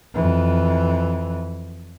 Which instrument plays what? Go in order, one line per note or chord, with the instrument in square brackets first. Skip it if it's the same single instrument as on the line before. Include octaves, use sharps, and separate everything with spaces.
[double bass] F2 E3